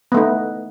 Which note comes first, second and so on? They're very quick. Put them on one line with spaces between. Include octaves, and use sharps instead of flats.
B3 A3 D#4